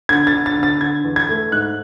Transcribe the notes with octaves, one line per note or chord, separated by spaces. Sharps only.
D3 G#6
A6
D3
A6
D3
A6
D3 G#6
E2
G#6
A3
G#2 F#6